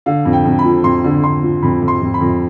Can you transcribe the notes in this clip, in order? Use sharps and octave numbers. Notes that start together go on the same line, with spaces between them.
D3 F5
F2
G5
F2
B5
F3
F2 C6
D3
D3 C6
F3
F2 B5
F2
C6
F2
B5
F2